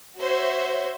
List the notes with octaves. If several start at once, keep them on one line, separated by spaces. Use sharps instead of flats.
F#4 C5 C#5 E5